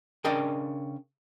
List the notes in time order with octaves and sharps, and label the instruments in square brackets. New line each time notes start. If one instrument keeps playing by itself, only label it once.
[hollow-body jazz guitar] C#3 D4 A#4 D#5 G5